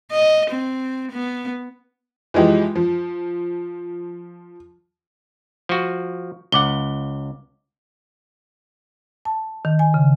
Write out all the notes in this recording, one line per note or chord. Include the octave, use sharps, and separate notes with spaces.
D#5
C4
B3
E3 F3 G#3 G4
F3
F3 F#4
C#2 F#5 D6 G7
A5
D#3
G#5
C#3